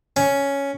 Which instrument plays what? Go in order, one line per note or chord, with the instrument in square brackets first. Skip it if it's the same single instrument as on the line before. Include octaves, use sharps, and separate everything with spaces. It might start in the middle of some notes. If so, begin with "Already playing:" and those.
[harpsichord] C#4